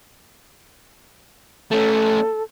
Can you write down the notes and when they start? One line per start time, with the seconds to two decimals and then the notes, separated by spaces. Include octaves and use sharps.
1.71 A3 C#4 A4